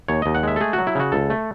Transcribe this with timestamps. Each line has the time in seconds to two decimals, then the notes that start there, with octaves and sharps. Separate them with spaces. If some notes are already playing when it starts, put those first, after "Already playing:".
0.08 D#2 C#5
0.22 D#2 D#5
0.35 F#5
0.43 G#3 E5
0.56 A4
0.61 A3 G#4
0.73 F#4
0.78 F#3
0.87 E4
0.95 C#3 F#4
1.12 C#2 A4
1.30 A3